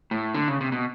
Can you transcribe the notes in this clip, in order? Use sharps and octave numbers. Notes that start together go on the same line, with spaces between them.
A2
D3
C#3
C3
B2